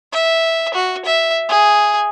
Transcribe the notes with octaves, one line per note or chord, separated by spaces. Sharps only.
E5
F#4
E5
G#4